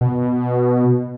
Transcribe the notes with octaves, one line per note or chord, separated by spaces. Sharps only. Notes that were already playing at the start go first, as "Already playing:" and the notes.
B2